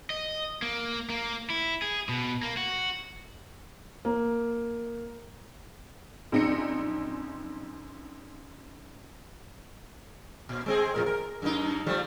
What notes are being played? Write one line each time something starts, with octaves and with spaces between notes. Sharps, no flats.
D#5
A#3
A#3
E4
G#4
B2
A#3
F#4
A#3
A#1 F#2 C4 D#4 A#6 C#7
A#2
G#3 C4 G#4
F2 A2 A#4
A#4
F#2 A#3 D#4
F3 G3 A3